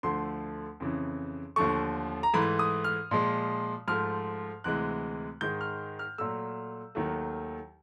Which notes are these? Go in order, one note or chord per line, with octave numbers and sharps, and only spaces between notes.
D2 D3 F3 A3 C6
F2 C#3 E3
D#2 D3 F3 A3 C#6
A#5
G#2 E3 A3 B5
D#6
F6
A#2 F3 G#3
G#2 F3 A3 F6
D2 C3 E3 G#3 F#6
G#2 D#3 G#3 G6
F6
F6
A#2 F#3 A3 E6
D#2 D#3 F#3 A3